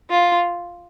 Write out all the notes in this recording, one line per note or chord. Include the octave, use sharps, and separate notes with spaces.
F4